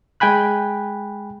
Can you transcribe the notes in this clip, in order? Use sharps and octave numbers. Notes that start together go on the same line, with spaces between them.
G#3 G5 G#5 B5 F#6